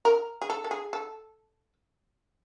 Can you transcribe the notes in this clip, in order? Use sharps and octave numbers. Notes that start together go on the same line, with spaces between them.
A#4
G#4
A4
A4
G#4
A4